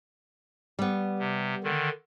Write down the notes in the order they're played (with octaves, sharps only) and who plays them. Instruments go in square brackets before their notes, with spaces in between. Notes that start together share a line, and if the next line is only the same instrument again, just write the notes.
[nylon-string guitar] G3 B3
[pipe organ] C3
D3 D#3